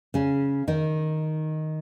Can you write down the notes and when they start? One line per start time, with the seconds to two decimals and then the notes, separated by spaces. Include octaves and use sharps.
0.14 C#3 C#4
0.68 D#3 D#4